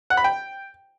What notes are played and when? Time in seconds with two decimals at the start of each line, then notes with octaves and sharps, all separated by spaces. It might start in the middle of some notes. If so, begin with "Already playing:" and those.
0.10 F#5
0.17 B5
0.24 G5